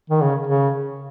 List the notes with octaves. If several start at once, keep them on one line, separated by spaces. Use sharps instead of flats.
D#3
C#3
C#3